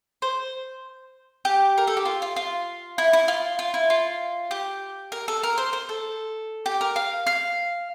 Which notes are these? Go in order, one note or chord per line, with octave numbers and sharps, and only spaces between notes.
C5
G4
A#4
A4
G4
F4
F4
F4
E4
E4
F4
F4
E4
F4
G4
A#4
A4
A#4
C5
C5
A4
G4
A#4
F5
F5